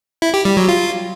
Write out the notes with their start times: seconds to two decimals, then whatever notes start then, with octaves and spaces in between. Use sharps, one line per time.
0.22 E4
0.34 G4
0.45 G3
0.57 F#3
0.69 F4